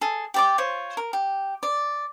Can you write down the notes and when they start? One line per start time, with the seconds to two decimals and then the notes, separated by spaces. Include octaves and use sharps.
0.01 G#4 A4
0.34 G4 D5 D6
0.58 F4 C5 C#5
0.97 A#4
1.13 G4
1.63 D5